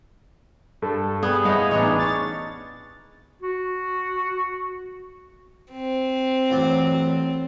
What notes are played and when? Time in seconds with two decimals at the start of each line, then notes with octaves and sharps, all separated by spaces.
0.82 G2 A4
1.23 G3 B3 G#4
1.45 E4 C#5 D#5 F5 F#5 B5 G6
1.71 A1 B3 D4 D#4 G#4 C#5
1.98 C#6 A6
3.43 F#4
5.71 C4
6.50 A1 F#3 D5